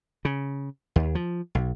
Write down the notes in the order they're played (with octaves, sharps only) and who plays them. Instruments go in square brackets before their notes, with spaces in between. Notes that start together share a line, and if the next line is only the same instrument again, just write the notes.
[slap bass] C#3
D#2
F3
B1